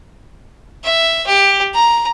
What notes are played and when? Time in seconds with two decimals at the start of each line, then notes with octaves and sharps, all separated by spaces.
0.84 E5
1.27 G4
1.74 A#5